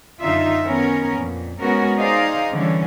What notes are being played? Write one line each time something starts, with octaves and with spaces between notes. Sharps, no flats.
F#2 D3 D#4 F4 E5
D#3 B3 C#4 A#4
F2 A#2
G#3 B3 C#4 F#4 A#4
D#4 G#4 C5 D5 D#5 F5
D3 E3 G3 C#4